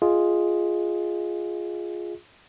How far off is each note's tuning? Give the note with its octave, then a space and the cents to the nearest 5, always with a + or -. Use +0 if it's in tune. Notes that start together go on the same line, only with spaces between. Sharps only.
F4 +0 G#4 +0 D#5 +15